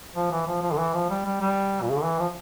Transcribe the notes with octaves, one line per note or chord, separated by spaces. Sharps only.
F3
E3
F3
F3
D3
E3
F3
G3
G3
G3
A#2
C#3
D3
E3
F3